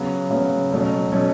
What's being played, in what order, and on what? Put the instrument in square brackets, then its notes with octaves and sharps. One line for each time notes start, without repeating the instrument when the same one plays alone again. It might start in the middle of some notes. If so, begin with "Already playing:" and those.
Already playing: [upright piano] C#3 F#3 B3
C#3 F#3 B3
B2 F#3 A3 C#4
B2 F#3 A3 C#4